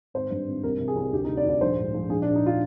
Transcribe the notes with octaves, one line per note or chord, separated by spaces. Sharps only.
G#1 C5
G2
G#1
C2 A#4
C3
G#4
C2
D2 G4
D#4
C3
D5
D2
D5
A#1 C5
G#2
A#1
A#1 G#4
D4
A#2
D#4
F4